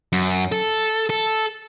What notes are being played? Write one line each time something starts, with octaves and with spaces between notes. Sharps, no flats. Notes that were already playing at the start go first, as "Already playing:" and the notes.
F#2
A4
A4